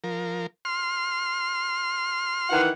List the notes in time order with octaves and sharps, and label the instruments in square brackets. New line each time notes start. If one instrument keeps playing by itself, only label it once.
[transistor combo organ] F3 A#4
C6 F6
[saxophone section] D#3 E3 F#5